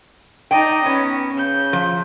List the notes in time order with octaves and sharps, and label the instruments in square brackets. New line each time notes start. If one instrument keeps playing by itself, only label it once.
[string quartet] D#4 D5 D#5 [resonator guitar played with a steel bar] G5
[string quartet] B3 C#4 [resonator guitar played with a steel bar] C#5
[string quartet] C#3 G6
[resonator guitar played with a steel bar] F3